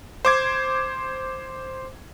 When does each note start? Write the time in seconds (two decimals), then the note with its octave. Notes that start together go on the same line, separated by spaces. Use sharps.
0.25 C5 D6 G#6